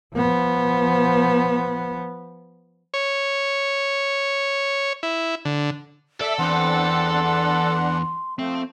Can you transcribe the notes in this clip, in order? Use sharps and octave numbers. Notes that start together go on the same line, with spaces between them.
F3 B3
C#5
E4
D3
A4 D5 E5
E2 C4 D4 F#5 C6
D4 F#5
F3 A3 C4